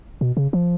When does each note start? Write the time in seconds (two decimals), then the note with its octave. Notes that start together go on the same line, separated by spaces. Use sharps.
0.21 B2
0.37 C#3
0.53 F3